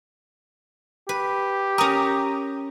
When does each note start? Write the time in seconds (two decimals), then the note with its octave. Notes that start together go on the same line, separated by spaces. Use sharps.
1.09 G4 B4
1.78 C#4 A#4 A#5 D#6